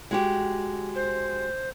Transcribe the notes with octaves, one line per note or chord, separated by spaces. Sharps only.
G#3 F#4 G4
C5